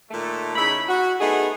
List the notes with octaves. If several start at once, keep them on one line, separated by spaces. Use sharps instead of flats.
A#2 D#3 A3
C#3 D#4 E4 B5
F#4
A3 B3 D#4 G#4